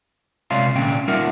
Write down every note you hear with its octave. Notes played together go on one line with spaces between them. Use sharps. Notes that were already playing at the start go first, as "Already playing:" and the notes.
C3 G#3 C#5 D5 F5 C6
A#2 D3 C#4 G5
G3 D#4 F4 A#4 E5 F#5